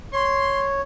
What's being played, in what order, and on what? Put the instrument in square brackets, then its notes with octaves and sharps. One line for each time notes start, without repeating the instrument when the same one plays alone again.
[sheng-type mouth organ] C#5 [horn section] C6